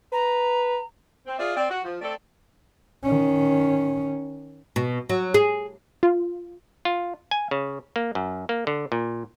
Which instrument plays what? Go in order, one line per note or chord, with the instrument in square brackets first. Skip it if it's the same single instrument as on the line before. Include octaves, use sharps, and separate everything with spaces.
[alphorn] B4 [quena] A#5
[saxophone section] C4
F4 G#4 D5 E5 F5
C4 D5
F#4
F3
A3 C4 A4 D5
[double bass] D#3 C#4
[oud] B2
F#3
G#4
[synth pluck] F4
[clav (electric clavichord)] F4
G#5
C#3
A#3
F#2
A#3
D3
A#2